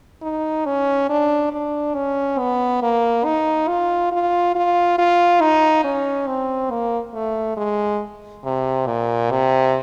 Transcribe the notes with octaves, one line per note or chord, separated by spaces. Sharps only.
D#4
C#4
D4
D4
C#4
B3
A#3
D#4
F4
F4
F4
F4
D#4
C#4
C4
A#3
A3
G#3
C3
A#2
C3